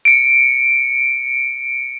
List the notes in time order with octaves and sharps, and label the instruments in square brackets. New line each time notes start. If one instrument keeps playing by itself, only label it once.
[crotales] C#7 D7